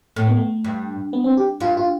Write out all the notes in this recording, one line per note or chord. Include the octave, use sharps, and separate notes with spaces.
A2 A3
B3
A3
G2
B3
C4
G4
G2 F4
F4